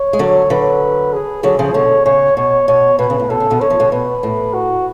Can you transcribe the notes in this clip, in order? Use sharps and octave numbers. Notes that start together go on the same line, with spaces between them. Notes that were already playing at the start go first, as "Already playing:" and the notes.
Already playing: C#5
G#3
D3 F#3
D3 F#3 B4
G#4
D3 F#3 G#4
C#3 F3
B2 D3 C#5
C#3 C#5
B2 C#5
B2 C#5
B2 B4
C#3
A2
B2 A4
C#3
B2 D3
D3 C#5
F3
B2 D3
B2 B4
A2
F#4